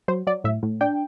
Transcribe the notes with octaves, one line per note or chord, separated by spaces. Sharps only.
F#3 C5
F#3 D5
A2 E5
A2
D4 G5